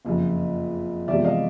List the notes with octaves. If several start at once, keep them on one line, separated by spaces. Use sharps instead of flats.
F#1 F2 C#3
E2 C3 F3 G#3 D5 E5
D#5 F5